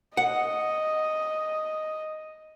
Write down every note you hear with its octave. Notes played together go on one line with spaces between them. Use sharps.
D#5 F#5